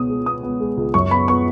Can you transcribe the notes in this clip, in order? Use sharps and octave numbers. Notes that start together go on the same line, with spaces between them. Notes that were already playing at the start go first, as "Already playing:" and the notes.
Already playing: C#2 B2 B3 D#6
G#3
B3 D#6
B3
G#3
C#2
F#2 C#6
B3 B5
B3 C#6